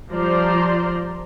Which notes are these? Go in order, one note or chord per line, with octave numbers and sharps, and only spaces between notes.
F3 G3 C5 D5 A#5 C6